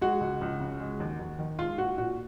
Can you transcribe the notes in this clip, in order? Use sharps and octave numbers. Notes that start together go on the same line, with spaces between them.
G#3 F#4
C#2
C#2
C#3
G#3
D#2
D#2
D#3
G#3 F4
A#2 F#4
A#2 F#4